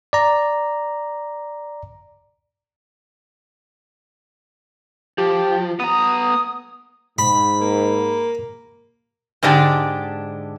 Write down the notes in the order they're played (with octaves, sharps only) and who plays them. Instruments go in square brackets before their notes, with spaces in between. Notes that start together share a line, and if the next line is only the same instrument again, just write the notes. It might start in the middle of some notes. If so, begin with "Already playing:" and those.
[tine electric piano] D5 A#5
[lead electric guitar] F3 [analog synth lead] G4
[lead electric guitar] B3 A#5 [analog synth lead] D#6
[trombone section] G#2 [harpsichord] B5
[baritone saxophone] A#3
[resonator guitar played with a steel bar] G#2 D3 G#3 D4 G4